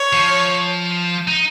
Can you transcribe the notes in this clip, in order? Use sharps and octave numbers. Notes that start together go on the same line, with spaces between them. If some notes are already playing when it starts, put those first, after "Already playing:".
Already playing: C#5
F3
D#4